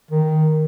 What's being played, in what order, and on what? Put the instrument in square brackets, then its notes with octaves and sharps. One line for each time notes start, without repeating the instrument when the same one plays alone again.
[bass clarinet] D#3